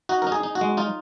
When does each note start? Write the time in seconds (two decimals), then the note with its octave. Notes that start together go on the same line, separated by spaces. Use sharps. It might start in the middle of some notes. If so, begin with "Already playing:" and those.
0.09 D#4 F#4
0.22 A#4
0.27 D#4
0.32 G#4
0.43 D#4
0.55 F#4
0.61 G#3
0.77 D#4 F4